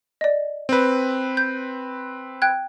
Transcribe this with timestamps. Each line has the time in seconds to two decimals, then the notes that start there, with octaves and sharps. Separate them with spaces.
0.21 D5 D#5
0.69 C4 B4
1.37 G6
2.42 G5 F#6 G#6